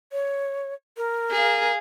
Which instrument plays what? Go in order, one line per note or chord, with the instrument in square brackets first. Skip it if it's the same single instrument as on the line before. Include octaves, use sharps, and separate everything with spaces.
[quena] C#5
A#4
[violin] G#4 F5